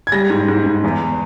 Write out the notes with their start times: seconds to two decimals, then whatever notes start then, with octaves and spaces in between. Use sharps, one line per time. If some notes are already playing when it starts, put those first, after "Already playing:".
0.07 G#6
0.12 G3 A#6
0.30 G#2
0.48 G#2
0.66 G#2
0.84 E2